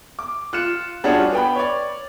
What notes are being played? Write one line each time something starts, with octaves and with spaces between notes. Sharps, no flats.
D6
F4 F#6 C#7 E7
G3 C#4 D4 F4 F#4 G#4
B3 G5 B5
C#5 D5